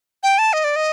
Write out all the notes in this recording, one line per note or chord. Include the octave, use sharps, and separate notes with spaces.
G5
A5
D#5
D5
D#5